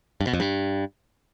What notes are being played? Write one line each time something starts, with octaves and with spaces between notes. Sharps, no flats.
G2
B2
F2
G2